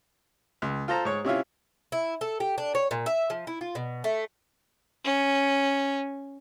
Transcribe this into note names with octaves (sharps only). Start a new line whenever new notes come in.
C#2
F4 A4 C5 A#5
G#2 C#5
C3 C#4 E4 F4
E4
A4
G4
D4
C#5
A#2
E5
F3
E4
F4
B2
A3
C#4